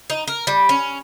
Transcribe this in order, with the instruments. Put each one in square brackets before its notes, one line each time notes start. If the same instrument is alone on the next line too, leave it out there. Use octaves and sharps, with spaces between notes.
[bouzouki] D#4
A#4
G3
C#4